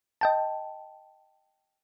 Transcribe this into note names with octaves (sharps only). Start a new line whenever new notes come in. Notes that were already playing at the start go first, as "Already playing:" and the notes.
D#5 G5 A5